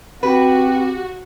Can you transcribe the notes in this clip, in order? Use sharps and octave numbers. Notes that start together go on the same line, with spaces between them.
C4 F#4 G4 B4